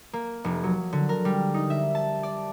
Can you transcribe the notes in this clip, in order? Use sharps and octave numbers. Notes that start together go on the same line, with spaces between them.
A#3
F1
F#3
D3
A#4
G3
D#4
E5
A5
D5